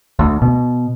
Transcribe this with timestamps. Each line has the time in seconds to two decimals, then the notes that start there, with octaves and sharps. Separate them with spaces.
0.19 D2
0.42 B2